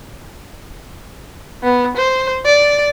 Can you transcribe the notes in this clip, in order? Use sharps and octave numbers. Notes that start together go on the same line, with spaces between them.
B3
C5
D5